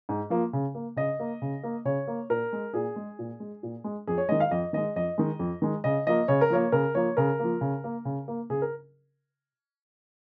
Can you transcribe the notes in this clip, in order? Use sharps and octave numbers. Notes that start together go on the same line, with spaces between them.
G#2
F3 A#3
C#3
A#3
C#3 D#5
A#3
C#3
A#3
C#3 C#5
A#3
A#2 A#4
G#3
A#2 G#4
G#3
A#2
G#3
A#2
G#3
F2 G#4
C#5
D#3 G#3 D#5
F5
F2 D#5
D#3 G#3 D#5
F2 D#5
D#3 G#3
F2
D#3 G#3
C#3 D#5
F3 A#3 D#5
C#3 C#5
A#4
F3 A#3 C#5
C#3 A#4
F3 A#3 C#5
C#3 A#4
F3 A#3
C#3
A#3
C#3
A#3
C#3 G#4
A#4